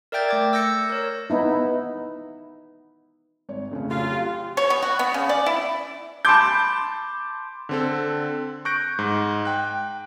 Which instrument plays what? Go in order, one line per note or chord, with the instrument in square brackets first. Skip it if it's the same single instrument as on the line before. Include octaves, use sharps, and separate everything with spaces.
[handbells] A#4 D5 E5 G5 G6 A6
A3 D6 G#6
E6 G6 A#6 C#7
A#4 C#5
[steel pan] B3 D#4 E4
[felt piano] G#1 C#5
F2 A2 C#3
[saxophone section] F#3 F4
[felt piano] G4 F5 C6
[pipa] C#5
B3
F#4
B3
C#3
D5
E4
[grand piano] A5 B5 C6 D6 G6
[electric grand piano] D3 C4 A4
C#6 F#6 G6 A#6 D7
G#2
G5 F#6